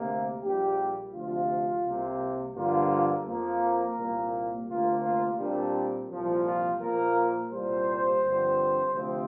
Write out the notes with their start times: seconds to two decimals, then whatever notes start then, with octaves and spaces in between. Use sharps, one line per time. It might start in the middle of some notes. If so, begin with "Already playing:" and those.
Already playing: D2 C3 A#3
0.42 A#1 A#2 G3 G4
1.13 D2 C3 F3 F4
1.84 C2 C3 A#3
2.54 G2 D3 F3 A#3 F4
3.25 F2 F3 A#3
3.61 A#4
3.97 C2 A#2 A#3
4.68 D2 C3 A#3 F4
5.03 F4
5.38 A#2 G3 C4 D4
6.10 C2 A#2 F3
6.44 F4
6.80 A#2 F3 A#3 A#4
7.51 C2 A#2 G3 C5
8.22 G2 D3 F3 C4
8.92 D2 C3 F3 C4